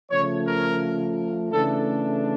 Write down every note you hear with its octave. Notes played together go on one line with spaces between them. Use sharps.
C#3 F3 A3 C#5
A#4
C#3 E3 A3 D4 A4